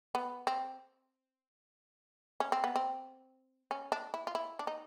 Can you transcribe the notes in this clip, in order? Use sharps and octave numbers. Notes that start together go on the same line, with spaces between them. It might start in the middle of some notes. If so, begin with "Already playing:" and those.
B3
C4
C#4
C4
B3
C4
C#4
D4
E4
F4
E4
D4
D#4